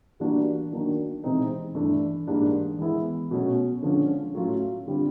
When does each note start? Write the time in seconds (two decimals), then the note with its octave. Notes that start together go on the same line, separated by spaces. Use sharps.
0.20 E3 G3 A#3 D4 F#4
0.72 D#3 F#3 A#3 D4 F#4
1.24 C3 E3 G#3 C4 D#4
1.75 G2 E3 A3 D4
2.27 G#2 E3 G3 A#3 D4
2.79 E3 G#3 B3 E4
3.31 B2 F#3 A3 C#4
3.83 D3 F3 G#3 C#4
4.34 A2 F#3 A3 C#4 F4
4.87 D3 G3 C4 F4